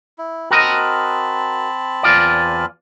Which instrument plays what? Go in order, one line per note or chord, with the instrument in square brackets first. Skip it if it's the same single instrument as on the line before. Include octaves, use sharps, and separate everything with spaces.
[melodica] E4
[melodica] C4 A5 B5 [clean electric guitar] F#4 A#4 D#5
[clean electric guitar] E2 F4 D5